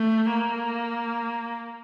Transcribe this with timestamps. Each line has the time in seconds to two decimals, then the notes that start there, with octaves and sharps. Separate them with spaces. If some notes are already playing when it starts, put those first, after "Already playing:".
Already playing: A3
0.32 A#3